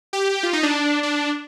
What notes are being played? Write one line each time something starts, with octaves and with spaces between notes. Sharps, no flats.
G4
F4
D#4
D4
D4